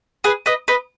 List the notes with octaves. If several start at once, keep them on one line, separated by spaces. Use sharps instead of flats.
G#4 B4
B4 D#5
B4 D#5